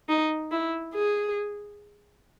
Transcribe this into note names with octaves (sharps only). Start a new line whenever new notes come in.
D#4
E4
G#4